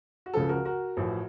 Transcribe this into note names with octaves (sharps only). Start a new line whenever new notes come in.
F#4
C#2 C#3 F3 A4
F#4 A#4
F#4 A#4
A1 A2 F3